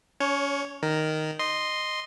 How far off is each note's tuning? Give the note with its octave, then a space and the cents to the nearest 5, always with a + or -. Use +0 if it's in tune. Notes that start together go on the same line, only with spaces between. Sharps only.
C#4 +30 C#5 +0
D#3 +0 A#4 +0
D#5 -10 C6 +0